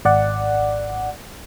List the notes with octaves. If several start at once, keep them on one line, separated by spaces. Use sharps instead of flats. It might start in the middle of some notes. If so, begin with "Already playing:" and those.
G#1 D5 F#5